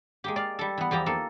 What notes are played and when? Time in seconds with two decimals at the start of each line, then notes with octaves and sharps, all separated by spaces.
0.24 G#3 A#3 G4
0.36 D5 F5
0.59 G3 A4
0.78 E3 B3
0.91 E2 F3 G4 A#5
1.06 A#3 D#4 A4